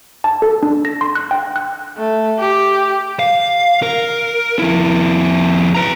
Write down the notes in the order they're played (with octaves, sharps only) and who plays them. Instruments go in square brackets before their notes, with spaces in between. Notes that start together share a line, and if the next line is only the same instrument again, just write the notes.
[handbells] A5
A4
D4
A#6
C6
F#6
G5
F#6
[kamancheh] A3
G4
[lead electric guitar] F5
A#4
F2 E4
B4 A#5